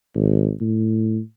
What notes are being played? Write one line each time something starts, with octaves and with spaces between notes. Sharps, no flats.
G#1
A2